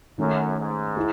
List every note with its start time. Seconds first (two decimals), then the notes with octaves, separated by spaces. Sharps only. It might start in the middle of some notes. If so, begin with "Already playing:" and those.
0.18 F#2 D#3 A3 C#4
0.58 G#2
0.96 E4 G#4